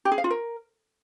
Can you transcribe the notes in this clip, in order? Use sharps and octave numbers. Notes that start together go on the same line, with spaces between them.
G4
G#4
F5
F4
A#4